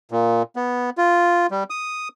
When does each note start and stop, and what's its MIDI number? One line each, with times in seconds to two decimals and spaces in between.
0.11 0.43 46
0.56 0.90 59
0.98 1.47 65
1.51 1.64 55
1.70 2.08 87